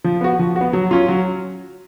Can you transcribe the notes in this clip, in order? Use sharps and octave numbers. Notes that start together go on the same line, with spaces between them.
F3
B3 F#4
F3
F#4
B3
F#3
C#4 F4
F#3